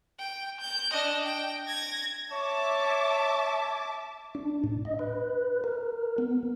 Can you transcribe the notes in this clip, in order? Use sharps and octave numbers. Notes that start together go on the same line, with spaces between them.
G5
G6
D4 D#5
G5
G#6 A#6
C#5 E5 A5 D6
D4
A2
D#5
B4
A#4
B3